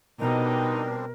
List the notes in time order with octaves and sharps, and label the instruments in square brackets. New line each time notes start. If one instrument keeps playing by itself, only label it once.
[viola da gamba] B2 [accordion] G3 C4 D4 [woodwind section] D#4 [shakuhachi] A#4